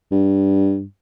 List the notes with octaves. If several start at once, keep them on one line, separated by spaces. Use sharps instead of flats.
G2